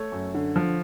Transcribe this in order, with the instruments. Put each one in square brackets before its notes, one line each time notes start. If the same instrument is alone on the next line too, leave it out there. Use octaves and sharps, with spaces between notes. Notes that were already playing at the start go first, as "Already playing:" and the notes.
Already playing: [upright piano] A3 C#5
F#2
D3
F3